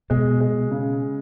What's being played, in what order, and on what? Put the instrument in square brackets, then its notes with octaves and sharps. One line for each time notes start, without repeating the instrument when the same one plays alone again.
[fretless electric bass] B2 [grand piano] G#3
[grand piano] G#3
C#3